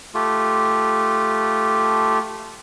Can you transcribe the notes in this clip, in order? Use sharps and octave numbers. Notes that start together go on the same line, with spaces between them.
A3 F4 G4